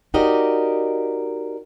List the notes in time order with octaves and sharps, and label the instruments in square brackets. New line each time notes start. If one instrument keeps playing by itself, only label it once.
[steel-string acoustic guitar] D#4 F#4 G4 A#4 D5 D#5